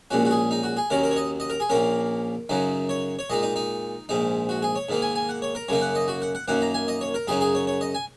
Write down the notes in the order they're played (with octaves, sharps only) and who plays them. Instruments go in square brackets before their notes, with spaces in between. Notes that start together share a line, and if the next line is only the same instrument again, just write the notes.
[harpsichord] A#1 A#2 G#3 C#4 F#4
F#4
G#4
D#4
F#4
G#4
D#2 D#3 F#3 C#4 A#4
A#4
C#5
D#5
D#5
A#4
G#4
A#1 A#2 A#3 C#4 A#4
F#2 C#3 F#3 D#4
C#5
C#5
A#2 G#3 D#4 D#5
D#4
D#4
A#1 G#2 G#3 D#4
F#4
G#4
C#5
G#2 D#3 A#3 D#4
G#5
G#5
F#5
C#5
A#4
F#2 C#3 A#3 D#4 C#5
F#5
D#5
F#4
F#5
F#5
F#2 D#3 A#3 F#5
A#5
G#5
D#5
C#5
A#4
F#2 C#3 F#3 D#4 G#4
G#4
C#5
C#5
D#5
G#5